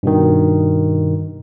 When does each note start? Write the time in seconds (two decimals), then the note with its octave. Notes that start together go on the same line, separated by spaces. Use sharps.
0.03 G2 B2 D#3